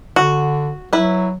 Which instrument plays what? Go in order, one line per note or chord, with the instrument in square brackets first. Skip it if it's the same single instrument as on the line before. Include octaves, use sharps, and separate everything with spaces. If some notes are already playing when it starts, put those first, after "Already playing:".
[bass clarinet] D3 [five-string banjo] F#4
[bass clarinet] F#3 [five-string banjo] E4 B4